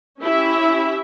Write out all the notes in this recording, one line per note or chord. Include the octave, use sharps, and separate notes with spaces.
C#4 E4 G4 E5